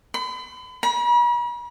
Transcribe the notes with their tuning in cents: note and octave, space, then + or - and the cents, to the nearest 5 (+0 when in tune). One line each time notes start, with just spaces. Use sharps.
B5 +40
B5 -45